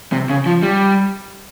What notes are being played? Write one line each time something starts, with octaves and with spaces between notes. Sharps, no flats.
C3
C#3
F3
G3